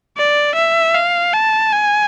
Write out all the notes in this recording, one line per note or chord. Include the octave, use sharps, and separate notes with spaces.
D5
E5
F5
A5
G#5